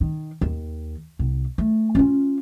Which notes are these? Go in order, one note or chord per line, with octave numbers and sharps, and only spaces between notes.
D#3
D#2
C2
A3
C#4 F4